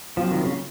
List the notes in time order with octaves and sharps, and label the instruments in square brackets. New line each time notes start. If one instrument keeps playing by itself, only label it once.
[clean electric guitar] C2 A#2 F#3 C4 F4 [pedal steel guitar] F3
[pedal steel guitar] D#3
C#3